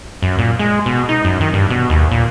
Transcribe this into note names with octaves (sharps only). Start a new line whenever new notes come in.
F#2
A#2
G#3
B2
D#4
F#2
D#3
G2
B2
D#2
A#2